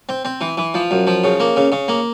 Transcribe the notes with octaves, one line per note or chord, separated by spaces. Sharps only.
C4
C4
E3
E3
F3
F#2
F3
C#3
A#3
C#3
C#3
A#3